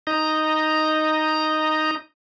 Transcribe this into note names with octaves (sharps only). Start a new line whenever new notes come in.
D#4 D#5 A#5